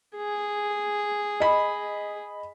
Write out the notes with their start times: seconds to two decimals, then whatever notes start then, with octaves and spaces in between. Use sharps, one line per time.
0.16 G#4
1.40 D#5 B5